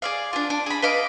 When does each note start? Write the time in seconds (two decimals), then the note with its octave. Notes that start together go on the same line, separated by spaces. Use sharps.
0.02 G#4 D5 F5
0.33 D4 F4
0.50 D4
0.66 G#4 B5
0.82 B4 D#5 F5 D6